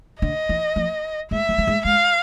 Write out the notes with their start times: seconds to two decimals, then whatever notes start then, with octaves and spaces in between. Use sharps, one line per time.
0.22 D3 D#5
0.49 E3
0.76 F3
1.31 G#3 E5
1.49 G3
1.58 A3
1.67 G#3
1.85 G#3 F5